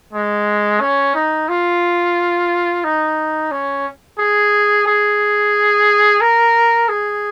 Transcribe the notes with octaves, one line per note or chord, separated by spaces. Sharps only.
G#3
C#4
D#4
F4
D#4
C#4
G#4
G#4
A#4
G#4